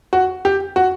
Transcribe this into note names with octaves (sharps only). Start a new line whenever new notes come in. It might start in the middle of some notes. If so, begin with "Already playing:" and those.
F#4
G4
F#4